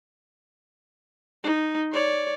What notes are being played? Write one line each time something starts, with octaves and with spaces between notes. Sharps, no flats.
D#4
C#5 D5